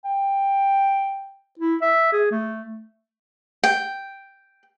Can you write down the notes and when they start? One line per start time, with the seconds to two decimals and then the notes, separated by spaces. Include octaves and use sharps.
0.05 G5
1.59 E4
1.81 E5
2.12 G#4
2.31 A3
3.64 G5